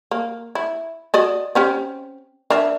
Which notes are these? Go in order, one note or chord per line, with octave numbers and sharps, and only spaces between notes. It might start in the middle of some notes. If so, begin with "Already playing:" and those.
A#3
E4
F#4 D5 D#5
C4 C#4 G4
D4 A#4 E5